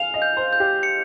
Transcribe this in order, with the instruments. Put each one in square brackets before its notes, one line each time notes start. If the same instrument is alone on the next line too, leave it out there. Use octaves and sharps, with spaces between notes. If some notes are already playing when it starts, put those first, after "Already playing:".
Already playing: [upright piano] F5 G#5 [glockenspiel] F7
[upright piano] D#5
[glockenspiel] G6
[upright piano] C5
[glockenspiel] G6
[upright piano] G4
[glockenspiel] C#7